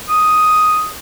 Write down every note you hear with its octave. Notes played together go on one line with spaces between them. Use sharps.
D#6